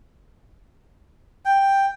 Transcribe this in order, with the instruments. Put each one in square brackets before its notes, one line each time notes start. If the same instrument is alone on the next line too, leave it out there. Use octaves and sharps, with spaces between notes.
[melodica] G5